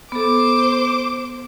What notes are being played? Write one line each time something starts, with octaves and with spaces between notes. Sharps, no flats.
B3 A4 C5 D6